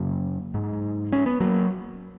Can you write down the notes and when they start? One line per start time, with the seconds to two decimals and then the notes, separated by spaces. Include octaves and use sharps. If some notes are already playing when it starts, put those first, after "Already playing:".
Already playing: F#2 C#3 F#3 A#3
0.54 G#2
1.13 C#4
1.26 B3
1.40 F#3 A#3